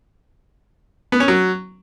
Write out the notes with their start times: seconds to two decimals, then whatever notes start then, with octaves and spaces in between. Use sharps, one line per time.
1.12 B3
1.20 C#4
1.28 F#3